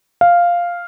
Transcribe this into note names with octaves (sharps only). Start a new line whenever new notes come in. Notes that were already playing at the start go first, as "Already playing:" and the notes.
F5